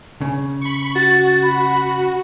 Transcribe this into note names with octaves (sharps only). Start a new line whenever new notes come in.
C#3
B5 C#6
F#4 A6
B5